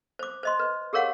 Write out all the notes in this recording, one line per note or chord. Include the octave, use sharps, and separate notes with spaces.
C5 D6
C5 D#5 C6
B4
G4 G#4 A#4 C#5 F5 F#5